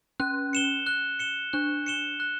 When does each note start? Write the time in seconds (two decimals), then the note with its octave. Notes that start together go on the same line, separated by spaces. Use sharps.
0.20 C#4 F#6
0.53 C#7 E7 G7
0.87 F#6
1.19 C#7 E7 G7
1.53 D4 F#6
1.86 C#7 E7 G7
2.20 F#6